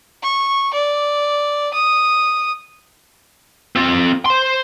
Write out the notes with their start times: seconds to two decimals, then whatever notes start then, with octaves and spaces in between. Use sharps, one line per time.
0.23 C#6
0.73 D5
1.73 D#6
3.76 C4 F4
4.26 C5 C6